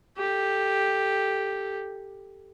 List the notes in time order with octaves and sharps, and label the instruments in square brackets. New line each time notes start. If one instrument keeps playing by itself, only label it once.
[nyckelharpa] G4 A4